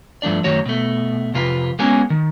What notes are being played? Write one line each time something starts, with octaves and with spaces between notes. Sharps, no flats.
G2 F3 A3 D4 D5
F#2 D#3 A3 F#4 C#5
B2 A3
F2 C3 F4 B4
G#3 A#3 B3 C#4 F#4 G#5
D#3